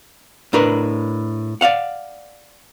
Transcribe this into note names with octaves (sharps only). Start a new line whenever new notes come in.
A2 D4 A#4 B4
D5 D#5 F5 F#5